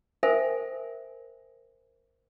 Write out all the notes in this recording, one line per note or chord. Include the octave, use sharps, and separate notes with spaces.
A4 A#4 C5 E5 G5 G#5